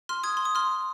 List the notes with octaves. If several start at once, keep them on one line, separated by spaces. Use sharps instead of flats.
C6 F6
D#6 G#6
C6
D#6
C6 F6